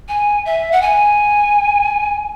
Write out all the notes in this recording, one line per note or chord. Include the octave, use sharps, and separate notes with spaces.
G#5
E5
F#5
G#5